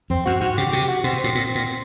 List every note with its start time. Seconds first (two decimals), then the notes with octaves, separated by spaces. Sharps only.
0.10 F2 C4
0.26 F#2 F#4
0.41 G#2 F#4
0.57 C#3 G4
0.72 C3 G4
0.88 F#4
1.04 B2 C4
1.19 A2 C4
1.35 A#2
1.55 A#2